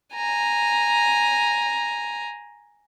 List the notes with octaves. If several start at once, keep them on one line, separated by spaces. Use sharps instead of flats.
G#5 A#5